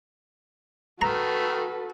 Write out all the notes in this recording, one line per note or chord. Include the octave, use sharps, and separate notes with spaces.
D#3 A3 F#4 A4 B4 A#5